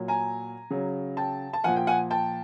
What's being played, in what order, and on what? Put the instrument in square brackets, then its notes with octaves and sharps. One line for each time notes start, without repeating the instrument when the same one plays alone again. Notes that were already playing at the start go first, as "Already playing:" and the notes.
Already playing: [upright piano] A#2 F#3
G#5 A#5
C#3 F#3
G5 A5
A5
A#2 F3 F#5 G#5
G5
F#5 G#5
G5 A5